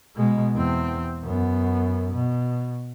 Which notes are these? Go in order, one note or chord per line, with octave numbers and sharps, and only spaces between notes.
B2 G#3
E2 C4
F#2 B3
B2